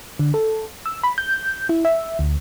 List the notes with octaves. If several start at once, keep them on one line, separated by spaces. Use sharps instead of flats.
D3
A4
E6
B5
G6
E4
E5
D2